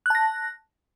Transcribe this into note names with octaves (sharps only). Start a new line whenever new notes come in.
A5 F#6 A#6